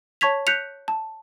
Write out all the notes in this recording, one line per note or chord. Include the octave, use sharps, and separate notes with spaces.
C#5 A5 C#6 G#6 B6 F7
F#6 G6 B6 C#7 F7
A5